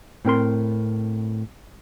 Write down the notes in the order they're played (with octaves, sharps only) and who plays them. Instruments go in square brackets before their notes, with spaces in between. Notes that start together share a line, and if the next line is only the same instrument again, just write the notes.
[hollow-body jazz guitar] A2 C4 A#4 C6